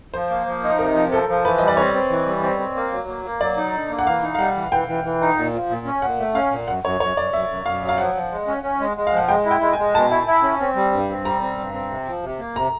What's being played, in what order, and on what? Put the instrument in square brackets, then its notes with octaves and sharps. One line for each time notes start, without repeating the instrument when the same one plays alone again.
[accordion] F3 [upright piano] C5
[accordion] A#3
F3
D#4
[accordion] C3 [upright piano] A#4
[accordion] F3
[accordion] F3 [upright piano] A4
[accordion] F3
[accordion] E3 [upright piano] B4
[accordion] G3 [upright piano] D#5
[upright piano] D5
[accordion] C4 [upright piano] C#5
[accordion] C4
E3
G3
C4
C4
A#3
F#3
A#3
A#3
[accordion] F#3 [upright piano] D5
[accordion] D#4
D3
A#3
[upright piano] F#5
[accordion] E3 [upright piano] F5
[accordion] D#4
[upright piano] F5
[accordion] G3 [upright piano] F#5
[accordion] E3
[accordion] E3 [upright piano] G5
[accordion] E3
E3
D#4
A#2
F3
A#2
C#4
[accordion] A#2 [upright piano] F#5
[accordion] A3
[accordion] C#4 [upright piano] F5
[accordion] A#2
[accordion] F#2 [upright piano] F#5
[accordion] F#2 [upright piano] C#5
[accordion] F#2 [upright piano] C#5
[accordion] F#2 [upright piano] D5
[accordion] F#2 [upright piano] E5
[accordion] F#2
[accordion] F#2 [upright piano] F5
[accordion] F#3
[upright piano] F5
[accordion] F3 [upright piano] F#5
[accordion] F3
G#3
C#4
C#4
G#3
G#3
[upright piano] F5
[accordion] F3
[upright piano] F#5
[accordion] G#3 [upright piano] G5
[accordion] E4
[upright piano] G5
[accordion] G#3
[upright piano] G#5
[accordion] G#3
[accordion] B2 [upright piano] A5
[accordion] E4
E4
C#4
C4
G3
G2
C4
[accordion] G3 [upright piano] A#5
[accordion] C4
G2
C4
C3
F3
C3
A#3
[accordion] C3 [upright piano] A#5